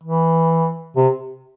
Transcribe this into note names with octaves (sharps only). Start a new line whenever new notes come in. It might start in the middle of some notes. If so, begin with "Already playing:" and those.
E3
C3